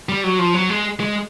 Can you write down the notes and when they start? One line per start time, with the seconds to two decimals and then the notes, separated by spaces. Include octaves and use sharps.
0.09 G3
0.24 F#3
0.39 F3
0.54 F#3
0.69 G#3
1.00 G#3